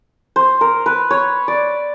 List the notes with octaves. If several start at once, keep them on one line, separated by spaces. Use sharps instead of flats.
C5
A#4
B4
C#5
D5